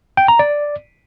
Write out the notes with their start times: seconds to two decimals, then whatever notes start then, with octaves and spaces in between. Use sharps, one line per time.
0.17 G5
0.28 A#5
0.39 D5